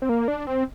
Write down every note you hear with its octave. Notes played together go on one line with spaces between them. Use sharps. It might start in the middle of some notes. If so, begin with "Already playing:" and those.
C4
A#3
D4
C4